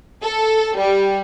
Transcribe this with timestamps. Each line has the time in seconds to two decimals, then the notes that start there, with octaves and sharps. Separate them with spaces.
0.22 A4
0.76 G3